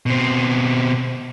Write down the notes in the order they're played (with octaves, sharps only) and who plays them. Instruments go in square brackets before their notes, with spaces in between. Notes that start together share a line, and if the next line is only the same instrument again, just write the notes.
[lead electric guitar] B2 C4